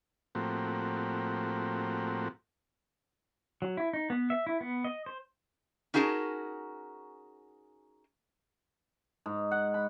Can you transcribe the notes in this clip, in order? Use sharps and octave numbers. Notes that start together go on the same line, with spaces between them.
A2 F3 A#3 C4 F#4 G4
F#3
E4
D#4
B3
E5
E4
B3
D#5
C5
C#4 D#4 F#4 G#4 A#4 A5
G#2
F#5
B5